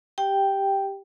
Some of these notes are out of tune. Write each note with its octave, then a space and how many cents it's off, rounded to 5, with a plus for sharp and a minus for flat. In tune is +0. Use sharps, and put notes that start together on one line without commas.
G4 +0 G5 +0